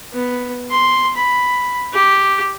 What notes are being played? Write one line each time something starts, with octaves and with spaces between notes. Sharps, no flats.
B3
C6
B5
G4